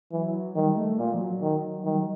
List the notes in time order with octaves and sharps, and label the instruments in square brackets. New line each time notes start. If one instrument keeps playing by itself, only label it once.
[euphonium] E3 [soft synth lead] F#3
[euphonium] D#3 [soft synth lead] G3
[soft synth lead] A3
[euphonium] A#2 [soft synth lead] A#3
[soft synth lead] F3
F#3
[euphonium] D#3
[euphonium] D#3 [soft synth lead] G3
[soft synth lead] F#3